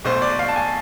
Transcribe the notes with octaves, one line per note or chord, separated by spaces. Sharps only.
B1 B2 A3 C5
D5
F5
A5
G#5